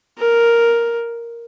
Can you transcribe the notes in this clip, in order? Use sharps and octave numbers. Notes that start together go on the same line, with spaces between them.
A#4